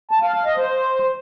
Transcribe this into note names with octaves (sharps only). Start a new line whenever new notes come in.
A5
F5
F5
D#5
C5